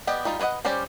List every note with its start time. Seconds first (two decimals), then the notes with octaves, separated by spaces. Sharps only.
0.07 B3 G4 D5 D#5
0.25 G3 D#4 F4
0.39 B3 B4 C#5 D#5 F#5
0.65 G3 C#4 G4 C5 D5